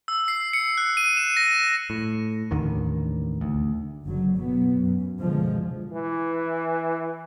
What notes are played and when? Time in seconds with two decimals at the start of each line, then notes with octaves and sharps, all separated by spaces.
0.08 E6
0.28 C7
0.53 C#7
0.77 F#6
0.97 D#7
1.17 E7
1.37 A#6
1.90 A2
2.51 A1 D#2 D3 D#3
3.41 D2
4.03 F#1 D3 F#3
4.35 B2 F#3 B3
4.81 F#2
5.19 B2 D3 F3 G#3
5.93 E3